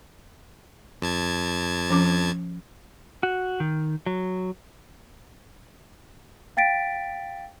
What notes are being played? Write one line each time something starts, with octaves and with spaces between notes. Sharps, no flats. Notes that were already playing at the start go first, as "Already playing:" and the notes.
F2 A5 G#6
F3 C#4 D6
F#4
D#3
F#3
F5 G5 A6 B6 D7